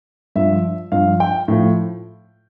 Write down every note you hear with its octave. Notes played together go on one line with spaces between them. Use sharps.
G2 F3 E5
G2 F3 F5
G5
A2 F3